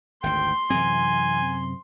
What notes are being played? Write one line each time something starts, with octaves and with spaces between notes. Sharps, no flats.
G#1 D2 G5 C6
F#2 C3 E3 C4 G#5